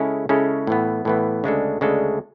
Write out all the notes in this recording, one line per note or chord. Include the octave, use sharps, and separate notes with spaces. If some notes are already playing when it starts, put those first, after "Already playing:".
Already playing: C#3 G#3 C#4 E4 A4
C#3 G#3 C#4 E4 A4
A2 E3 B3
A2 E3 B3
D2 C#3 G#3 D4 A4
D2 C#3 G#3 D4 A4